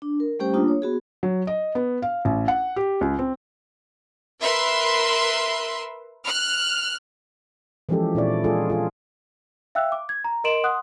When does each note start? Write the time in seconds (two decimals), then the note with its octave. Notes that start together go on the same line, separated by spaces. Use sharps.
0.02 D4
0.20 A#4
0.39 G3 A3 C#4 G4 C5 G5
0.53 A#3 D4 F4 D#6
0.68 C#5
0.82 B3 F#4 G#4
1.23 F#3
1.47 D#5
1.75 B3
2.02 F5
2.25 A1
2.48 F#5
2.76 G4
3.01 C#2
3.19 C4
4.41 A#4 B4 E5 C6
6.23 F6 F#6
7.89 E3 F3 G#3 C#4 G4 A4
8.15 A#2 C4 D4 E4 C#5 D5
8.44 G#3 D4 F4 G#4 A4
8.70 F4 G#4
9.75 E5 F5 G5 E6 F#6
9.92 D6
10.09 G#6
10.24 A#5
10.44 A#4 D#5 C6 D7 E7 F#7
10.64 F#5 C6 D#6 F#6